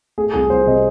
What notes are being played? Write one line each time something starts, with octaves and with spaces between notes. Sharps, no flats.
A3 G#4
C2 G#4
C2 C5
C3 D#5